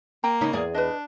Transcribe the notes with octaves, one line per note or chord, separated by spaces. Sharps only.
A#3 G5 A#5
C#3 C#4 D#4
E2 G#4 D5
D4 B4 D#5